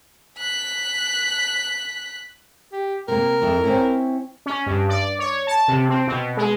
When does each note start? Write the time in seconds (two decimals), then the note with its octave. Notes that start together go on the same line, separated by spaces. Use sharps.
0.39 F#6 B6
2.72 G4
3.08 C3 A#3 A#4
3.42 F2 E4
3.64 C4 C#4 E4
4.46 C#4
4.66 G2
4.89 D5
5.19 C#5
5.47 A5
5.68 C3
5.89 C4
6.07 B2
6.37 G#3